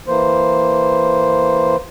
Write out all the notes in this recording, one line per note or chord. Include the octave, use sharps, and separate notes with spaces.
E3 A#3 C5